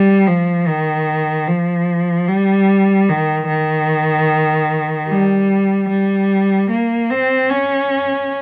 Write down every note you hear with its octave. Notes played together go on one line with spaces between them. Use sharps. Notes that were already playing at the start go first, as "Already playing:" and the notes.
Already playing: G3
F3
D#3
F3
G3
D#3
D#3
G3
G3
A#3
C4
C#4